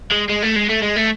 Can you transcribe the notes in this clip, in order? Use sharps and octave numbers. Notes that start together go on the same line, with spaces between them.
G#3
G#3
A3
G#3
A3
G#3
A3